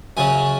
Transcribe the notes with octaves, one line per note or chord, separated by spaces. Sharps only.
F#2 C#3 F#3 G#5